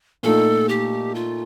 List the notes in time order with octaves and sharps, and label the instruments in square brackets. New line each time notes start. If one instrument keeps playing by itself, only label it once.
[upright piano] A#2 A3 D#4 [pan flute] A4
[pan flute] G4
F4